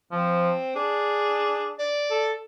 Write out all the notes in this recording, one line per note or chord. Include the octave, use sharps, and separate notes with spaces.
F3 C4
D4 G#4
D5
A4